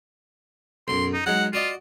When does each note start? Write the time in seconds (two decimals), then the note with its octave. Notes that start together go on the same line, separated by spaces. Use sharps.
0.88 B1 F#2 C6
1.13 D#4
1.26 F#3 G#3 D#4 F#5
1.53 F4 F#4 D5 D#5